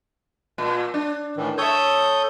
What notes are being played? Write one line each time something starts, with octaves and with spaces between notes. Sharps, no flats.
A#2
D4
A2 D#3 E3
A4 C#5 E5 D#6 G6